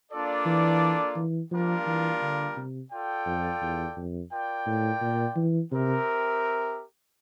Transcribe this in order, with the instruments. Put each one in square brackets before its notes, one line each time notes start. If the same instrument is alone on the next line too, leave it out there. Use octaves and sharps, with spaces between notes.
[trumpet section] A#3 D4 F4 A4 D5
[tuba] E3
E3
[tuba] F3 [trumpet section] G3 A#3 D4 F4 A#4
[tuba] E3
D3
C3
[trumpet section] F4 A4 D5 G5
[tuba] F2
E2
F2
[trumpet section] F4 A#4 D5 G5
[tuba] A2
A#2
E3
[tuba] C3 [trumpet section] C4 G4 A#4 E5